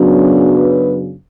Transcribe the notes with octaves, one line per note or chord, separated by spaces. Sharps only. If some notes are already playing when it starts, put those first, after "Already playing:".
Already playing: F#2 C#3 F#3 B3 D4
B4